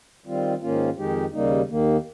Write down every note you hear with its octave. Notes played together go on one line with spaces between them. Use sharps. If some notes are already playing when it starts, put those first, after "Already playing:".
D#3 G3 C4 F4
G#2 D#3 A#3 C#4 F4
F2 D#3 G#3 D#4 G4
D#2 C#3 G3 A#3 D#4
D#2 D#3 A#3